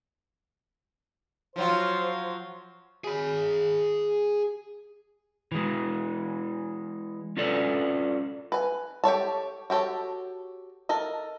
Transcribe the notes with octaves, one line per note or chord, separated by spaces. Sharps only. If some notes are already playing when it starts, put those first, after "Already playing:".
F3 F#3 F4 C5
G#4 B5
E3 G#3
C#4 F4 A4 D5
B4 G#5
G4 A4 C#5 A5
F#4 G4 A4 C#5
A4 A#4 D#5